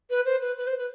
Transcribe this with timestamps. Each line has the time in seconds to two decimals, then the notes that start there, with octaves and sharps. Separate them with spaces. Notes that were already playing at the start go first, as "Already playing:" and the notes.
0.10 B4
0.25 C5
0.41 B4
0.57 B4
0.67 C5
0.78 B4